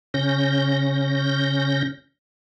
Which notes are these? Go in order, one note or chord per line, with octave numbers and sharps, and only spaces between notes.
C#3 C#4 G6 A#6